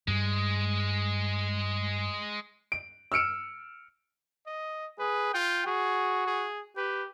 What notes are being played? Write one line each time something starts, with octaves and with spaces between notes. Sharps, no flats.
G2 G3 G#3
D7
E6 F6 C#7 D7 E7
D#5
G#4 B4
F4 G5
F#4 G#4
G#4
G4 B4